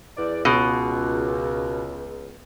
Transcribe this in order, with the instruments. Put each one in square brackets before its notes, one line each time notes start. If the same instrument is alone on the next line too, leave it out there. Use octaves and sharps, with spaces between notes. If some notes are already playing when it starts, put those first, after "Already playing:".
[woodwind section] E2 D5
[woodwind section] C#2 [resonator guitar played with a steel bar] B2